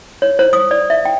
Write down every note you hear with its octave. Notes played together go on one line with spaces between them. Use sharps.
C#5
C5
D#6
D5
E5
G5